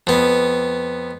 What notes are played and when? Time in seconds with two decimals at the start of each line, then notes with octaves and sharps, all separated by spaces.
0.07 F2 B3